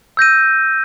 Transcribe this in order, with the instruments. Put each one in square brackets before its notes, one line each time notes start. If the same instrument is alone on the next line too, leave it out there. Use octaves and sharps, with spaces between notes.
[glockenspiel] E6 G6 A#6 D#7